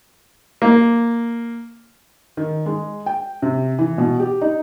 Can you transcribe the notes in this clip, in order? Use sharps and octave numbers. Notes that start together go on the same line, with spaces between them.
A#3
D#3
G#3
G5
C3
E3
B2
G4
D#4